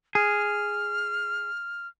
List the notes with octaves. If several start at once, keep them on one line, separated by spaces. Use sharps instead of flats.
G#4 F6